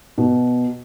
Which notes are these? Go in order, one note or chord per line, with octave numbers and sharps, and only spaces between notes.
B2